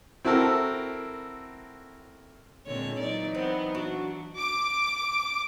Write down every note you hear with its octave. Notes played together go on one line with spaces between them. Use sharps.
C4 E4 F#4 A4 A#4
A#2 D3 G#3 C4 C#5
E3 F#3 D#4 D5
B3 C4
D4 F#4
D6